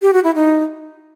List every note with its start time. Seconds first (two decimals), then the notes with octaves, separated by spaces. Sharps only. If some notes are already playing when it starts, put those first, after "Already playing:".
0.02 G4
0.13 F#4
0.24 E4
0.35 D#4